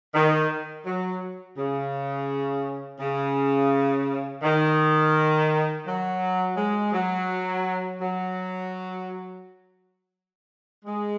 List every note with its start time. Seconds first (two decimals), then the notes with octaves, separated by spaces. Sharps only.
0.14 D#3
0.85 F#3
1.57 C#3
3.00 C#3
4.43 D#3
5.86 F#3
6.57 G#3
6.92 F#3
8.00 F#3
10.85 G#3